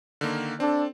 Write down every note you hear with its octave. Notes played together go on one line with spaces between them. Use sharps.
D3 D#3 A#3
C4 D4 A4